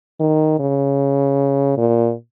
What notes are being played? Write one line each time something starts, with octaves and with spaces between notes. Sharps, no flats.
D#3
C#3
A#2